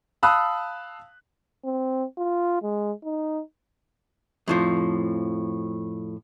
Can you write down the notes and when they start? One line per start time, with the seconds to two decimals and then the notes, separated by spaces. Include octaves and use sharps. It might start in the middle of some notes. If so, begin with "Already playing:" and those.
0.23 F5 A5 B5 D#6 E6 F#6
1.65 C4
2.18 F4
2.62 G#3
3.04 D#4
4.48 F2 A2 F3